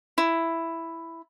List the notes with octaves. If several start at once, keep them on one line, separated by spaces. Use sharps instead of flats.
E4